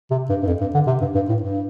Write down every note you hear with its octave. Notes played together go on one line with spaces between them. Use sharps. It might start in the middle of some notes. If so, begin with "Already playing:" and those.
C3
G2
G2
F2
G2
D3
C3
G2
G2
A2
G2